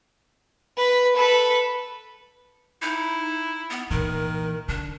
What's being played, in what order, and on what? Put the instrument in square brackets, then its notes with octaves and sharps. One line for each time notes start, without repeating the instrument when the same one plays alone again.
[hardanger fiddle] B4 B5
A4 B4
[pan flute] D#4 [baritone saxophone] E4
[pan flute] B3
[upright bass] A#2 E3 [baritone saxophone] D#3 [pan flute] A#4
[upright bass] D3 [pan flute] D4